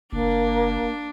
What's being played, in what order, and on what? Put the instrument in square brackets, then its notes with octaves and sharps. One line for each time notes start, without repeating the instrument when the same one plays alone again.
[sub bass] F#1 [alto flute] A#3 [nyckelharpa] D4